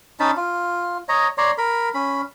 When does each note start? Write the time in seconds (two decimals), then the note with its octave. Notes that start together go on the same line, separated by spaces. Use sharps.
0.20 C#4 D#4 A5 B5
0.37 F4
1.09 C#5 D#5 A#5
1.38 C#5 D5 A#5 C6
1.58 A#4 B5
1.94 C#4 B5